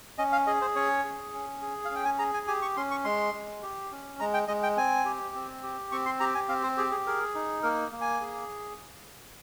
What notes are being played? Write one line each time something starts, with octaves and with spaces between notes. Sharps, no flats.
C#4 D#5
F5
G#4 D#5
C5
C#4 C#5
G#4
C#4
G#4
F5
C#4 G5
G#5
G#4 A#5
G#5
G4 G#5
C#6
C#4 C6
C#6
G#3 C6
G#3
G4
C#4
G#3 A#5
G5
G#3 D#5
G5
C4 G#5
G4
C4
G4
C4 C#6
C6
G4 A#5
G#5
C4 F5
C5
G4 G#4
G#4
G#4 A#4
D#4
A#3 A#4
A#3
G#5
G#4